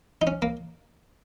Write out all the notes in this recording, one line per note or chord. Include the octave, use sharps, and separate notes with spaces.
D#4
C#4
A#3